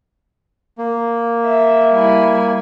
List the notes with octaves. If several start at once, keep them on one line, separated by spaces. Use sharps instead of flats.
A#3
E5
G3 E4 G#5